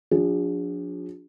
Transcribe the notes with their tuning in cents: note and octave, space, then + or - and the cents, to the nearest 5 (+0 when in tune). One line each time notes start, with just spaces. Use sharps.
F3 +35 D4 -20 G#4 -30